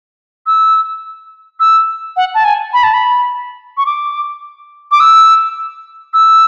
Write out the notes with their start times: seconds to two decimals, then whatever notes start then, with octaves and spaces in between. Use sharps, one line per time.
0.46 E6
1.60 E6
2.16 F#5
2.34 A5
2.45 G#5
2.73 B5
2.83 A5
2.94 B5
3.77 C#6
3.86 D6
4.91 D6
5.00 E6
6.13 E6